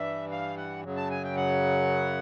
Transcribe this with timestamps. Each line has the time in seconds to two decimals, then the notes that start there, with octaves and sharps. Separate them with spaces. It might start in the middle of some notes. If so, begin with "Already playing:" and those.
Already playing: G2 E3 G3 E5
0.31 F5
0.57 F#5
0.84 F#2 C#3 F#3
0.97 A5
1.11 G#5
1.24 G5
1.37 F#5